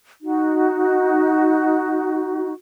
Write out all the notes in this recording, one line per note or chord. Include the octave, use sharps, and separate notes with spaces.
D#4 F#4